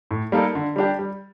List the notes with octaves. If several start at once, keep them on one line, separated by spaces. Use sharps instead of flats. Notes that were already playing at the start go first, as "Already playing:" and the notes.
A2
G3 A#3 D#4 A4
D3
G3 D4 G4
G3